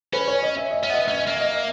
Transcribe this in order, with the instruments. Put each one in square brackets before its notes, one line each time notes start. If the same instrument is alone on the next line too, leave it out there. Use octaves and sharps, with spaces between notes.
[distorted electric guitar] C#4 [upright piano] B4
[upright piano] C#5
D#5
E5
D#5
[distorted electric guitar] C#4 [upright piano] E5
[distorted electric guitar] B3 [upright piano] D#5
[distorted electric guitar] C#4 [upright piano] E5
[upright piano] D#5
[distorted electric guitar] A#3 [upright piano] E5
[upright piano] D#5
E5